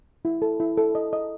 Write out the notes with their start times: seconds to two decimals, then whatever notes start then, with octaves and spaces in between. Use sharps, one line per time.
0.25 E4
0.42 A4
0.60 E4
0.78 A4
0.95 D#5
1.13 D#5